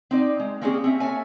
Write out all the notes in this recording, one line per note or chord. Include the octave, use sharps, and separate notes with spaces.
C4 D#4 D5
G#3
A#3 C4 C#4 F4 G4 G#4
C4 C#4 E5
A#3 A4 C#5 E5 G#5